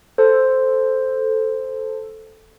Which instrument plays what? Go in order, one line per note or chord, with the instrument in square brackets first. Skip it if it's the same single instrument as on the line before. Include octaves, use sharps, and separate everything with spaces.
[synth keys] A4 [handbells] C5